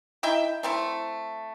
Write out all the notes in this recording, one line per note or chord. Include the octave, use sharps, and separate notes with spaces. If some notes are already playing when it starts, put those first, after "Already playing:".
D#4 E4 E5 G5
A3 C4 E4